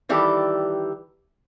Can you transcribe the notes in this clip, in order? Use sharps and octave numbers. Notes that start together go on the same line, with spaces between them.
D#3 E3 G3 G4 A4